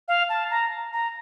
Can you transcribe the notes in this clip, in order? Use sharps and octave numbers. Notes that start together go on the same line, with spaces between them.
F5
A5
A#5
A#5